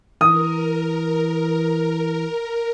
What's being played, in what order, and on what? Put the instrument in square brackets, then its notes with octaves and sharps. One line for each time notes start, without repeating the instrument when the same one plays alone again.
[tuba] E3 [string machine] A#4 [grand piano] D#6